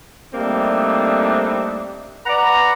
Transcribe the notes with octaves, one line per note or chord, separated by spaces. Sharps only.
G3 A3 A#3 C4 D4 D#4
B4 D5 F#5 A#5